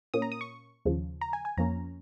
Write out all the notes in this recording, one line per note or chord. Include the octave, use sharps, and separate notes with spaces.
A#2 A#3 C#4 D#6
A#5
D#6
C#6
D#2 C#3 F3
A#5
G#5
G#5
F2 F3 A#3 C#4 A#5